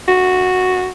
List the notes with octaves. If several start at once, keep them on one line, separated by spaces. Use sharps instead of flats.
F#4